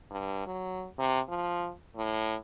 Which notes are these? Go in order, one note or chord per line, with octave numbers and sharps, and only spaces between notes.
G2
F#3
C3
F3
A2